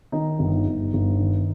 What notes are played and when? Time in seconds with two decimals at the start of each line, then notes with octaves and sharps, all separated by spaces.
0.12 D#3 D#4
0.39 G1
0.66 G1
0.93 G1
1.20 D#3